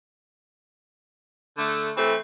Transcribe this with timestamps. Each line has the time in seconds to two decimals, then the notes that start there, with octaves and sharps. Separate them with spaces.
1.58 D3 A3
1.97 E3 A3 C4